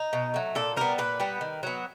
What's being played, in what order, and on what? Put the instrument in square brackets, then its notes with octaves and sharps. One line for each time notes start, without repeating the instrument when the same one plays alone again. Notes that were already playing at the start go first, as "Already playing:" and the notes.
Already playing: [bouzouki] D#4
B2
F#3 A3
A#2 A4
G3 B3 A#4
A#2 B4
G3 B3
D#3
F#3 B3